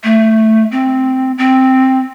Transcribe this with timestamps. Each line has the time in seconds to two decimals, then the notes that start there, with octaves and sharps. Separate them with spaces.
0.04 A3
0.72 C4
1.38 C4